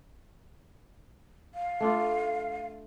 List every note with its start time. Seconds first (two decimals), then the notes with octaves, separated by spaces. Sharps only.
1.54 F5
1.81 A3 D4 F4